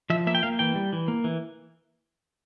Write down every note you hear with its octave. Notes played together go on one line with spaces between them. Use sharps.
F3 E5
A#3 E5
G5
A#3 F5
E3 G5
G3
E3
A#3
E3